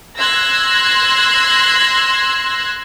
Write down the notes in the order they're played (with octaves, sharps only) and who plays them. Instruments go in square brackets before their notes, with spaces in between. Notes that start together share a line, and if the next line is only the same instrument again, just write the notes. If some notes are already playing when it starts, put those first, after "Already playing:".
[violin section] C6 E6 F#6 G#6 A#6